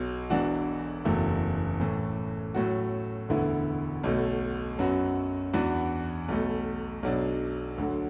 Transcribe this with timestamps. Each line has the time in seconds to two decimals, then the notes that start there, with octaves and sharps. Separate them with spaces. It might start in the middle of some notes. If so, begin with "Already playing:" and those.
Already playing: B1 B2 F#3
0.30 E1 E2 E3 D4 F#4
1.05 F#1 E2 B2 A3 E4
1.80 A2 E3 A3
2.54 A2 F#3 A3 F#4
3.29 E1 D2 D3 B3 E4
4.04 B1 B2 A3
4.79 F#2 F#3 B3 F#4
5.53 E2 E3 B3 D4 F#4
6.28 B1 B2 A3
7.03 B1 B2 F#3 D4
7.78 D2 D3 F#3